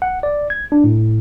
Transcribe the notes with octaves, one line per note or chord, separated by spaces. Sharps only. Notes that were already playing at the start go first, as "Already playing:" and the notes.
F#5
D5
G#6
D4
A2